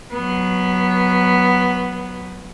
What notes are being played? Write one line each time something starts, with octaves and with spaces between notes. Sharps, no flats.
F#3 B3